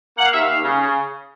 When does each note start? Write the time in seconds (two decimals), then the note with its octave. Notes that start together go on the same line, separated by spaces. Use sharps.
0.17 A#3 F#5
0.25 F5
0.33 D#2 E5
0.40 F5
0.50 D#2
0.64 C#3
0.80 C#3